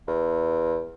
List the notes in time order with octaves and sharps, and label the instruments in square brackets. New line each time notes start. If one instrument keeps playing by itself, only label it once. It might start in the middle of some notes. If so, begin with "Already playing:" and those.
[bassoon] E2